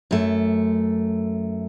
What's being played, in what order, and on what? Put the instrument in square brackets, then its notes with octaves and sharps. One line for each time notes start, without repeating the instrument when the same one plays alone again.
[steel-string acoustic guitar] F#2 A3